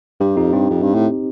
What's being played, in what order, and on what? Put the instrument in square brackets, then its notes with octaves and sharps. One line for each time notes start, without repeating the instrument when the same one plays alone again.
[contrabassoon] G2 [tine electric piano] G4
[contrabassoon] F2 [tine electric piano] D#4
[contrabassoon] G2 [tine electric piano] C4
[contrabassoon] F2
G2
A2